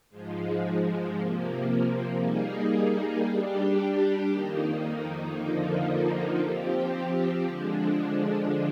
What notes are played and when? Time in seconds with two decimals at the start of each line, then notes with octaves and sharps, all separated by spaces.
0.10 G#2 F3 G#3
1.15 C3 F3 A#3
2.20 G3 A#3 D#4 G#4
3.25 G3 D4 G4
4.30 F2 D#3 A#3 D#4
5.35 F2 D3 F3 A#3 D#4
6.40 F3 C4 G4
7.46 D3 F3 G#3 D4